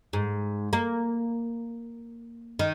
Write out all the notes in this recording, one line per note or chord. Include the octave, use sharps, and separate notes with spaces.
G#2
A#3
D#3